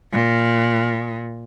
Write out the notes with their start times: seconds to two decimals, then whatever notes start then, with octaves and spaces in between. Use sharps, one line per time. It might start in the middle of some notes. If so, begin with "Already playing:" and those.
0.13 A#2